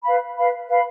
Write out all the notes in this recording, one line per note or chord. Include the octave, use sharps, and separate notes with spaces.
B4 F5 B5
B4 F5 B5
B4 F5 B5